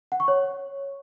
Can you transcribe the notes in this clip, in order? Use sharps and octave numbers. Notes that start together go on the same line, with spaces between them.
F#5
C#6
C#5